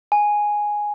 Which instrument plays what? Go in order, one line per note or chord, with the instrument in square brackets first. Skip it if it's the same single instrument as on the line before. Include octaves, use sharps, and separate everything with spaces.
[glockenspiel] G#5